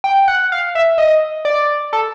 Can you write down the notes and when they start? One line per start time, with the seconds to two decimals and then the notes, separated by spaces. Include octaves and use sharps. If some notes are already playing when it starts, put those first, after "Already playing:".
0.04 G5
0.28 F#5
0.52 F5
0.75 E5
0.98 D#5
1.45 D5
1.93 A4